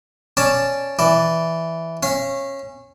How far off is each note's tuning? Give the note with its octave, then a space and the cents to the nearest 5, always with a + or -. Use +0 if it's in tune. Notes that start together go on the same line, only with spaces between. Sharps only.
C#4 +0 D5 +0 A5 +0
E3 +0 D5 +0
C#4 -20 F5 -40